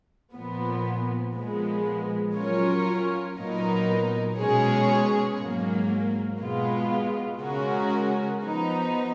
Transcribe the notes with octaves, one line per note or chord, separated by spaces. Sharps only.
A#2 F3 B3
A#2 F3 G#3 B3
F#3 C#4 F4 A#4 C#5
A#2 F#3 B3 D#4 A#4
B2 G#3 C#4 G#4 C#5
G#2 F#3 A#3
B2 G#3 B3 F4
C#3 G#3 C#4 F#4 A#4
F3 B3 D#4